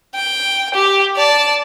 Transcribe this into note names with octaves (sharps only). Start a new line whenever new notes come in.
G5
G4
D5 A5